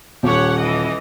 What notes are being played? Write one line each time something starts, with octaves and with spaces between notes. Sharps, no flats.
D#1 G4 C#5 F#5
E3 D#5